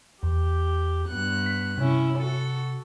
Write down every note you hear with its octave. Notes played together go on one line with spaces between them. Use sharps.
E2 G4
G2 B3 F#6
B6
C3 C#4 E4
F#4 A4